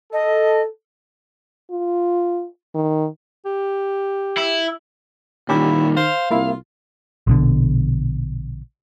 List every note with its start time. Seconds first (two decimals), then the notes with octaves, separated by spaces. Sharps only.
0.13 A4 D#5
1.71 F4
2.75 D#3
3.46 G4
4.37 E4
5.49 A#2 D#3 G3 C#4 E4 G4 A#4
5.97 C5 F5
6.31 C2 A#3 E4 F4
7.27 A#1 B2 D3